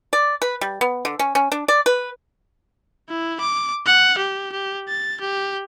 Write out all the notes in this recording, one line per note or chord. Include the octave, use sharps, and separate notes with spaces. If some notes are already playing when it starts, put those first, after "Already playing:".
D5
B4
G3
B3
D3
C#4
C#4
D4
D5
B4
E4
D6
F#5
G4
G4
A6
G4